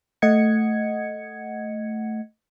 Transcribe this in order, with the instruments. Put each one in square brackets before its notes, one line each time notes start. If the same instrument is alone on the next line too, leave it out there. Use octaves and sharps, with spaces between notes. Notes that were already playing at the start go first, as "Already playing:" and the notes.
[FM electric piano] A3 D#5 F#5 G#6 C#7